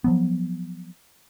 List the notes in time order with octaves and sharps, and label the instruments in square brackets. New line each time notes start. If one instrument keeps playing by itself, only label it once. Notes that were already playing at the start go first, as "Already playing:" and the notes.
[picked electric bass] F3 F#3 B3